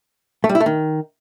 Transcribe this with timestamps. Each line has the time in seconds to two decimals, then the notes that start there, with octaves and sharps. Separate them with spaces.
0.44 A3
0.49 G3
0.55 E4
0.60 A3
0.66 D#3